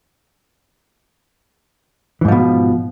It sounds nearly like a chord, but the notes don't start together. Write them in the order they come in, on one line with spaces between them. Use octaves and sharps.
E3 G#2 F3 B2